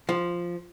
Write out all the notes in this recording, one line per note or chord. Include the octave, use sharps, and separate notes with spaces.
F3